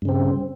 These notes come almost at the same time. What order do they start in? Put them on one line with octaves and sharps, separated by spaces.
G2 C#3 C4